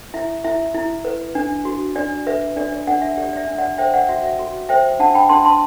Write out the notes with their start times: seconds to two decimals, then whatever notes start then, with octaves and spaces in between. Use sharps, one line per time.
0.14 E4 E5
0.44 E4 E5
0.74 E4
1.05 B4
1.35 D4
1.65 F#4
1.95 D4 D5
2.27 B4 E5
2.56 D4 D5
2.72 D5
2.87 D4 D5 F#5
3.02 E5
3.17 G4 D5
3.33 D5
3.37 E5
3.47 D4
3.58 D5 F#5
3.78 C5 E5 G5
3.94 D5 F#5
4.09 F#4 E5
4.24 E5
4.39 F#4
4.69 C5 E5 G5
4.99 D4 F#5 A5
5.14 G5 B5
5.29 D4 A5 C6
5.45 A5 C6